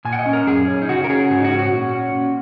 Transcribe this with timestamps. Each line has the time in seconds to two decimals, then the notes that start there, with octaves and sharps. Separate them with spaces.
0.05 A#2 G#5
0.13 F#5
0.19 D#5
0.26 C#4
0.33 A#4
0.47 F#2 G#4
0.68 C#4
0.82 D#4
0.89 C#3 F#4
1.04 A#4
1.09 C#4 G#4
1.31 G#2 F#4
1.40 D#4
1.44 F#4
1.52 C#4
1.59 F#4
1.72 A#2
1.94 C#4
2.15 A#2